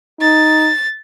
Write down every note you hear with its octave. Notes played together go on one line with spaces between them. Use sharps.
D#4 A6